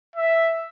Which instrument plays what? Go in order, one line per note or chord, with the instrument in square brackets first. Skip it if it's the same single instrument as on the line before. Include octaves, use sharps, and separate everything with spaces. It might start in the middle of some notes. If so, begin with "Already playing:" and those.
[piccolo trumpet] E5